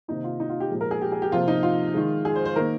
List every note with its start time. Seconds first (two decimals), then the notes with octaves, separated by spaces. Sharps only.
0.08 C3 D#3 A#3 D#4
0.24 F4
0.40 D#4
0.50 F4
0.60 G4
0.71 A#2 F3 G#3
0.81 A#4
0.91 G#4
1.01 G4
1.12 G#4
1.22 G4
1.32 C3 F3 A#3 F4
1.48 D#4
1.63 F4
1.94 D#3 G#3
2.25 G#4
2.35 C5
2.45 C5
2.56 D#3 A#3 A#4